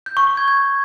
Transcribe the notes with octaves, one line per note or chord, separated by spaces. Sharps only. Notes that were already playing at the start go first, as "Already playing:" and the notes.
G6
C#6
C#6
G#6
G#6